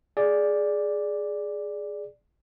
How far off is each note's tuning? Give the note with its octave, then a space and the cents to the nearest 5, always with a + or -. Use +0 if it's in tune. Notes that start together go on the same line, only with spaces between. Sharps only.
G#4 +5 D5 +0